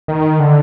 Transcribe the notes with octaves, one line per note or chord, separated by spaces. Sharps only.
D#3
D3